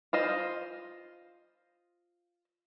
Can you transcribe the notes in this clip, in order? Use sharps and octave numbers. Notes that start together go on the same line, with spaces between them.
F4 C5 D#5